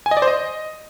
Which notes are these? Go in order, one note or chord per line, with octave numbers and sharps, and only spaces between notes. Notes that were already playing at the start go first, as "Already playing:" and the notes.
G#5
D#5
D5
C5
D#5